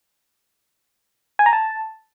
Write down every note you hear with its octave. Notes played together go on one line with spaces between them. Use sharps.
G#5
A#5
A5